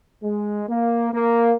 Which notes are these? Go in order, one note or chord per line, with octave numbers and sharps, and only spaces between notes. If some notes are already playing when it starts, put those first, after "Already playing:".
G#3
A#3
A#3